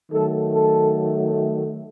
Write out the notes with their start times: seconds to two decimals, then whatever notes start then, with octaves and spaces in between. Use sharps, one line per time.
0.11 D#3 F#3 A3 A4
0.54 A4